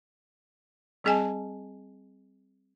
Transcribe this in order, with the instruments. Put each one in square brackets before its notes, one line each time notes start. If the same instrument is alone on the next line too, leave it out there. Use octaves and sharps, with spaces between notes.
[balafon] G3 C4 G#4 D#5 G#5 A5